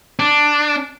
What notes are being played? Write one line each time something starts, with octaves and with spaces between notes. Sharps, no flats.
D4